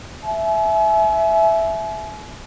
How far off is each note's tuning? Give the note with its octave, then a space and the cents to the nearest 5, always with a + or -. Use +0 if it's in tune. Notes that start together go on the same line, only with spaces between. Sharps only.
E5 +0 G#5 +40